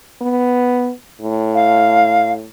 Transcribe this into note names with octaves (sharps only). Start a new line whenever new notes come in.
B3
A2
F5